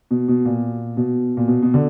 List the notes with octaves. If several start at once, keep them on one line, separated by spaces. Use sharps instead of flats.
B2
B2
A#2
B2
A#2
B2
B2
D3